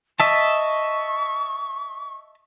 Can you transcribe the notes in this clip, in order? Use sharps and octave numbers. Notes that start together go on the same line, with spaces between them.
D#5 E5 A5 C#6